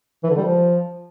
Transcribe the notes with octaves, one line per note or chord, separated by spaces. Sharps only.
E3
D3
G3
F3